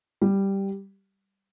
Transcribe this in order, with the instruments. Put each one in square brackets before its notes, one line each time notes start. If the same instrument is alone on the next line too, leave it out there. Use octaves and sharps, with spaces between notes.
[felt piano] G3